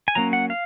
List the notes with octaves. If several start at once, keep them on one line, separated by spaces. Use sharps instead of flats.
G#5
F#3 A#3 C#4 A#5
F#5
F5